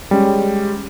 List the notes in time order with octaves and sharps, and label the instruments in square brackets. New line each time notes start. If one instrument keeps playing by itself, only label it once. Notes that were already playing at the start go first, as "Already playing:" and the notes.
[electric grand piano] G3 G#3 C#4